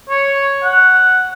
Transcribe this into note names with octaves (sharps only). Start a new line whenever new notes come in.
C#5
F#5